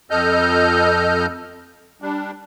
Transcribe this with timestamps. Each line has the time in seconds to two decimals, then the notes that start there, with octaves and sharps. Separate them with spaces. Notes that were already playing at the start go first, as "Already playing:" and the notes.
0.11 F2 A4 D#5 F6 G6
2.02 G3 D4